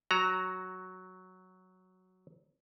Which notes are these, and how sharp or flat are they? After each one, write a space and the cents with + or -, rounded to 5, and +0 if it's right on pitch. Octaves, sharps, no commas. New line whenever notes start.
F#3 +0 F#4 +0 A#5 +5